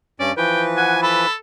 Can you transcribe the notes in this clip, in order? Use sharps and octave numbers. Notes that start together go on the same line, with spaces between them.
G2 C#4 D5
E3 F3 B4 G5
F#5 G#5
A4 B5